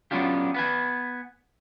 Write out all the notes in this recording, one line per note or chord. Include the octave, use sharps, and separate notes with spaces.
F#3 B3 C#4 D4 F4 G4
B3 B4 G#5